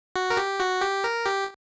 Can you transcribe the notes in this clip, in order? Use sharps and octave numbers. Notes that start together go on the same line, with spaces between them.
F#4
A#4
G4
F#4
G4
A#4
G4